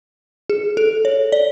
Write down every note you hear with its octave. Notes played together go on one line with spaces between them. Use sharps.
G#4
A4
C#5
D5